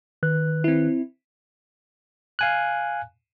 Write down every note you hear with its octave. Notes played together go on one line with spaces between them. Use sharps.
D#3 B4 F#6
C4 E4
F5 G#5 F#6